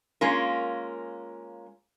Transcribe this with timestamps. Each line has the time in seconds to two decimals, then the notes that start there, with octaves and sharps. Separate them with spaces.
0.21 G#3 A#3 C#4 F4 A#4